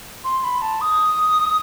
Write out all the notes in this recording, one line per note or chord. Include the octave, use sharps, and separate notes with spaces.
C6
B5
A5
D#6